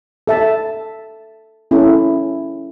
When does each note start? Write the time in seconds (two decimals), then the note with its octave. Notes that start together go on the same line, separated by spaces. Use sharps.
0.27 A4 E5 A5
1.71 C#4 E4 A4